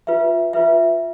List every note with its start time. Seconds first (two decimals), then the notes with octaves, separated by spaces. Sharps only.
0.07 F4 B4 E5
0.53 F4 B4 E5